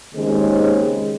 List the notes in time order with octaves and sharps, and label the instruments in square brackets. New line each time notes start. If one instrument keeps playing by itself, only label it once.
[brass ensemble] D#2 C#3 G#3 C4